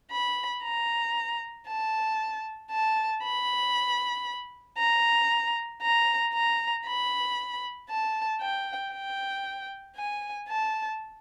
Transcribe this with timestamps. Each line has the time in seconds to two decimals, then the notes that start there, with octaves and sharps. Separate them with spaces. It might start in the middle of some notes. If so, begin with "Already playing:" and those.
0.11 B5
0.63 A#5
1.67 A5
2.71 A5
3.23 B5
4.78 A#5
5.82 A#5
6.33 A#5
6.85 B5
7.89 A5
8.41 G5
8.92 G5
9.96 G#5
10.49 A5